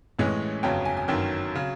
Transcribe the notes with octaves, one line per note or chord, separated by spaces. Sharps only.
A1 A2 E3 G#3 C#4
G1 F2 C#3 F#3 G5
G#5
G#5
G1 F#2 D#3 F#3 G5
C#3 F#3